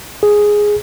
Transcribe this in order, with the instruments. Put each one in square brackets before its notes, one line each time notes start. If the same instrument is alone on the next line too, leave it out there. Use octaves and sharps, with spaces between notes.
[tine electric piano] G#4